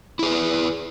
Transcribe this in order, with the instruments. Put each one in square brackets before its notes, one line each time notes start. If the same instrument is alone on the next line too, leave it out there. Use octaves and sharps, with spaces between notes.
[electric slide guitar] E4
G#4
B4